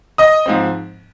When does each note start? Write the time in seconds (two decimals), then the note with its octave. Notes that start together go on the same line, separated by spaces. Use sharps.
0.18 D#5 D#6
0.46 G#2 F3 C4